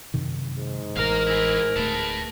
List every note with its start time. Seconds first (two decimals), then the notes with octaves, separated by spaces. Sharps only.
0.14 F#2 C3 D#3
0.56 G#2
0.96 A1 A#4 F5 A#5
1.27 E4 G#4
1.76 D1 A3 B4 A5